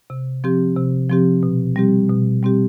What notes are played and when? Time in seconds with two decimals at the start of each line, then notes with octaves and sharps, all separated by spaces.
0.10 C3
0.44 F3 C4 G4
0.77 C3
1.09 F3 C4 G4
1.43 B2
1.76 G3 C4 G4
2.10 B2
2.43 G3 C4 G4